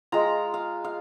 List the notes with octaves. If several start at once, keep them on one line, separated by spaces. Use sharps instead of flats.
G#3 F4 A#5
F5
F5